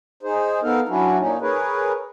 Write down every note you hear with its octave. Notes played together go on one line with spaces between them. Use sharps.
D#4 G#4 C5
B3 D#4 A4 A#4 F5
F#3 C#4 D4 E4 F#4
A#2 C#4 D#4
G#4 A#4 B4 C#5